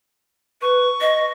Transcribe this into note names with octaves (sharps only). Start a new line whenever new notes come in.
B4 C#6
D#5